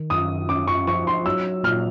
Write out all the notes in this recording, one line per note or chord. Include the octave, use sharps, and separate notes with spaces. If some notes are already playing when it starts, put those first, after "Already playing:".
Already playing: D#3
F#2 D#6
C#4 D6
C#6
F3 C#6
C6
F#3 E6
A#2 F6